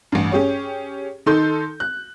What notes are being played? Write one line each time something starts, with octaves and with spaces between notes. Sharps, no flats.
A1 G2
C#4 G4 G#4 C#5
D#3 D#4 A4 C6 G6
F#6